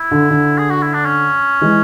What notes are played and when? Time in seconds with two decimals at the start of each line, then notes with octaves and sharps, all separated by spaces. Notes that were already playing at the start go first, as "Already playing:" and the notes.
Already playing: E4
0.11 D3
0.30 D3
0.58 G#4
0.70 F#4
0.82 E4
0.94 D4
1.06 C#4
1.61 E3 G#3